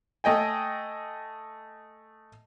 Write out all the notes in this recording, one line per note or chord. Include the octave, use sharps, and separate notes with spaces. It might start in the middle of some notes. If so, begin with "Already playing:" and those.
A3 D#5 G5 G#5